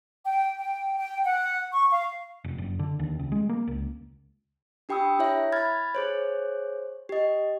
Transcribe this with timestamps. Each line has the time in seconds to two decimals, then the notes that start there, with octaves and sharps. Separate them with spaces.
0.25 G5
0.60 G5
0.98 G5
1.25 F#5
1.72 C#6
1.91 F5
2.44 F1
2.58 F#1
2.79 D3
2.99 D#2
3.19 C#2
3.32 G#3
3.49 A#3
3.68 C#2
4.89 D4 G4 G5 B5 D#6 E6
5.19 E4 C#5 E5
5.52 B5 F6 G#6 A6
5.95 G#4 C5 C#5
7.09 G4 D#5